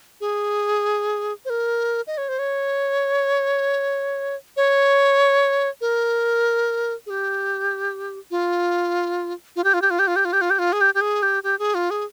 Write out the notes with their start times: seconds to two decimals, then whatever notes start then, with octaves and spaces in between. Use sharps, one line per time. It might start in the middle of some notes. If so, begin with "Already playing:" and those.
0.21 G#4
1.45 C5
1.50 A#4
2.07 D#5
2.18 C#5
2.29 C5
2.39 C#5
4.57 C#5
5.81 A#4
7.06 G#4
7.10 G4
8.31 F4
9.56 F4
9.64 G4
9.74 F4
9.82 G4
9.90 F4
9.99 G4
10.07 F4
10.16 G4
10.25 F4
10.33 G4
10.41 F4
10.50 G4
10.59 F4
10.73 G#4
10.81 G4
10.94 G4
11.01 G#4
11.22 G4
11.44 G4
11.59 G#4
11.75 F4
11.91 G#4